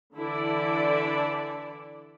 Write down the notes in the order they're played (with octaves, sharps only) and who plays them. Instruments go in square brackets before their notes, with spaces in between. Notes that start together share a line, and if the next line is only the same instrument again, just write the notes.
[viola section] D3 E3 E4 A4 D5